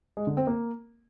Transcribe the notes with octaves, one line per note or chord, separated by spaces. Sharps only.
G#3
D3
C4
A#3